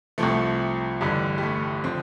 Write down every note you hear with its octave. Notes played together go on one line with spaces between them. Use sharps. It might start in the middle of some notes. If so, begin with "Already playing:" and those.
C2 C3 F3 A3
A1 G2 D3 G3
G3
A3
D3 F3 C4